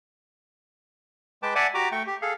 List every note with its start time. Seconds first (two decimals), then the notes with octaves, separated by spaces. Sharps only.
1.43 G#3 B4 G5 A5 D6
1.55 D5 E5 F#5 G#5 A5 D6
1.74 F#4 G4 A#5 D6
1.92 A3 G5 C#6
2.07 G4
2.22 G#4 A4 F5